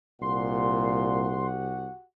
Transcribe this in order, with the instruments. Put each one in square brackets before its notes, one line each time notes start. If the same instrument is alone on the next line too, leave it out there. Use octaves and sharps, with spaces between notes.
[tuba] C2 [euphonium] A#2 [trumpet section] F#4 G4 F#5 [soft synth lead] C6